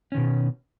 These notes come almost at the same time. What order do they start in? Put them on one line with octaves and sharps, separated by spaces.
C#4 D#3 B2